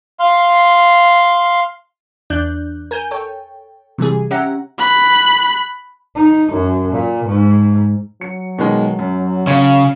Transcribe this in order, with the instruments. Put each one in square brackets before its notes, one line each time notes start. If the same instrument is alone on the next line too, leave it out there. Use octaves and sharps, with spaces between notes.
[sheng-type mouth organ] F5 C6
[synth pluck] E2 D4 D5 F#6 G6
A#4 G#5 G6 D#7
A4 C#5 G5
C3 E3 G3 G#4
C#4 G4 E5 F#5 A#5
[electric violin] B5 F#6
[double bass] D#4
F#2
A#2
G#2
[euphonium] F#3 [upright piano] C#7
[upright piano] B2 D#3 G#3
F#2
[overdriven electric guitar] C#3 [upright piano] C#5 F5